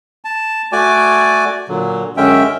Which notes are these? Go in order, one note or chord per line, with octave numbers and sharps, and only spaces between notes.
A5
A3 F#4 D5 G#5 D6
A#2 D3 F#3
F#2 D3 G#3 C#4 E5 G5